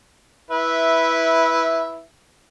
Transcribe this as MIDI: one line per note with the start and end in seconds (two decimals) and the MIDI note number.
0.51 2.02 64
0.51 2.02 71
0.51 2.02 76